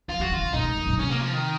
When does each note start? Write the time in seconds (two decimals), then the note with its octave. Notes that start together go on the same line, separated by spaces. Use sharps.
0.08 F#3 F4
0.19 F3 F#4
0.31 D#3 F4
0.43 C#3
0.54 A#2 D#4
0.65 G#2
0.76 F#2
0.87 A#2
0.99 C3 C#4
1.10 A#3
1.21 F3
1.33 D#3